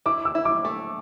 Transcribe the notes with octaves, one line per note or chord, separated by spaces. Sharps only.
E4 D6
E6
E4
D6
A3